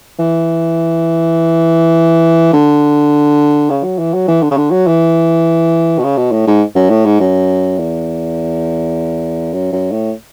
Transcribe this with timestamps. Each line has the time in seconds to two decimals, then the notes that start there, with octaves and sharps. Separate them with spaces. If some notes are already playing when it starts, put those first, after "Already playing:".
0.19 E3
2.53 D3
3.70 C#3
3.84 F#3
3.98 E3
4.14 F#3
4.28 E3
4.42 D3
4.51 C#3
4.57 D3
4.71 F#3
4.87 E3
5.99 B2
6.04 C#3
6.17 B2
6.32 A2
6.47 G#2
6.76 F#2
6.90 A2
7.05 G#2
7.20 F#2
7.78 E2
9.53 F#2
9.72 F#2
9.92 A2